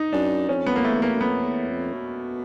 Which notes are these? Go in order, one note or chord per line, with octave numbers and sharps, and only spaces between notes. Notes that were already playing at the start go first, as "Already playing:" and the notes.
Already playing: D#4
F#2 D4
F2 C#4
B3
A#3
E2 A3
A#3
F#2
F2 B3
E2
F2
B2